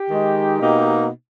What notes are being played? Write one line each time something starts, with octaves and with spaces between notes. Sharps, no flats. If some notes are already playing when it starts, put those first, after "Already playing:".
Already playing: G4
D#3 G#3 D#4
B2 A#3 D#4